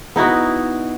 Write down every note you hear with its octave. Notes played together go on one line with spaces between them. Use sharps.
B3 D#4 E4 F#4